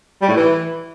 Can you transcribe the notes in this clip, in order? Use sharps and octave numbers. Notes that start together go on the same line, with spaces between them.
G3
A2
E3